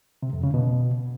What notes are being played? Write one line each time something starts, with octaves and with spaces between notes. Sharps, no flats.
C3
F2
C#3
B2